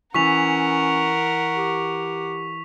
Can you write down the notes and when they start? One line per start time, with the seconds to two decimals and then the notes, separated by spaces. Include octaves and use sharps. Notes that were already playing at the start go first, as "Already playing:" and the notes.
0.14 E3 C#4 A#4 F#5 C#6 B6 F7
1.57 G4